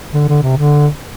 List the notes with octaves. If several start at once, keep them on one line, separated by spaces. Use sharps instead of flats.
D3
D3
C3
D3